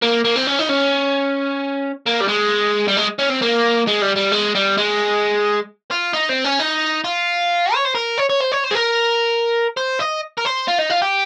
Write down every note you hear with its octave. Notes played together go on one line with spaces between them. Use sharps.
A#3
A#3
C4
C#4
D#4
C#4
A#3
G3
G#3
G3
G#3
C#4
C4
A#3
G#3
G3
G3
G#3
G3
G#3
F4
D#4
C4
C#4
D#4
F4
C#5
C5
A#4
C#5
C#5
C5
C#5
C5
G#4
A#4
C5
D#5
A#4
C5
F4
D#4
F4
G4